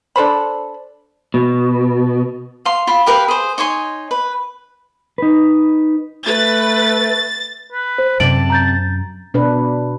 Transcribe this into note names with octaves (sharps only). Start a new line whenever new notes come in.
D4 A4 C5 B5
B2
F5 C6
F4 B5
G4 A#4 B4 F5
G#4 C5
D#4 C#5 G#5 C6
B4
D#4 B4
A3 B4 A6
B4
C5
F#2 C3 D5 A5 D7 F#7
A#5 G6 A6
B2 D4 B4